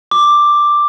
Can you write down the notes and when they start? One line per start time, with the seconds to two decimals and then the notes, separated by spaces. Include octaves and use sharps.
0.11 D6